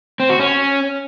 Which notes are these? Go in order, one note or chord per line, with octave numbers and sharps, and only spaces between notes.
C4
F#4
C#4